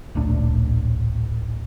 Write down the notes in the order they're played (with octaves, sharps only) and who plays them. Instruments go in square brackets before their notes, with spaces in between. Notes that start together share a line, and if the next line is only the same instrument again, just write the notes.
[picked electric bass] D1 A#1 A2 D4